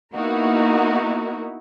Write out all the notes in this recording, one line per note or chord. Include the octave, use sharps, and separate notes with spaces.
A#3 B3 D#4 E4 F#4 A#4